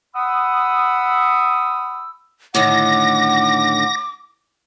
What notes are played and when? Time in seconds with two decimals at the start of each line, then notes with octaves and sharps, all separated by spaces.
0.15 F#5 B5 D#6 E6
2.55 A2 D3 D#3 F#5 D6 A#6